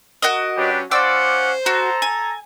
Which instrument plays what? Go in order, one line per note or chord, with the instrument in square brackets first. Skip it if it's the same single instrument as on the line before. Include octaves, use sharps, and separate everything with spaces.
[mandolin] F#4 A#4 D#5
[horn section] F#3 C#4 [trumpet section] D4 G4 B4
[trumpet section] C#4 F4 F#5 [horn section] C5 [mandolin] D5 D6 E6
[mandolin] F#4 [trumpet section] A4 A#5
[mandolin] G#5